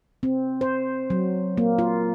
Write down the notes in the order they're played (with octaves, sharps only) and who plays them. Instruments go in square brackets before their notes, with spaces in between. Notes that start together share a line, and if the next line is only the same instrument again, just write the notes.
[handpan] C4
C5
F#3
A#3
F4